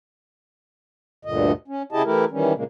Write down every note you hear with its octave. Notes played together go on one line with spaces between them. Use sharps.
D2 G2 A#2 D3 D#5
C#4
C#3 E4 G4 G#4 D#5 A5
E3 A3 E4 G4 A#4
D#3 E3 G3 C#4
A#2 C#3 G#3 A#3